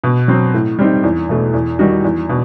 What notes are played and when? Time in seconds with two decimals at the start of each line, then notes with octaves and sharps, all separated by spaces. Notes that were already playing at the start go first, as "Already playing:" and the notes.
0.04 B2
0.28 F#3 C4
0.54 A2
0.79 G3 C4 D#4
1.03 E2
1.29 B2 A3
1.53 E2
1.79 D#3 G3 D#4 F#4
2.04 E2
2.29 B2